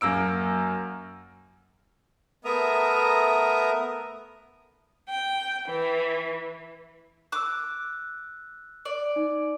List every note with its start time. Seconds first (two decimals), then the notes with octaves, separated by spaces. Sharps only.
0.01 F#2 A#3 E6 D7
2.45 A3 B3 A#4 E5 A#5 D#6
5.08 G5
5.68 E3
7.32 D6 E6 F#6
8.85 D5
9.16 D#4